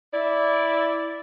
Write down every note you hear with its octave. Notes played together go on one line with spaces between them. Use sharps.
E4 D5